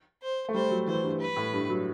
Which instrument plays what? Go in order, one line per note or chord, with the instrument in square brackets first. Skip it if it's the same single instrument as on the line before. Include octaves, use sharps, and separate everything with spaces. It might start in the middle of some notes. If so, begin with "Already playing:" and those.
[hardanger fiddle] C5
[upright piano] A3
[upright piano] G3 [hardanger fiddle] C5
[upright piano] F#3
[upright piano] E3 [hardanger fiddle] C5
[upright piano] G2
[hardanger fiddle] B4
[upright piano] A2
G2
F#3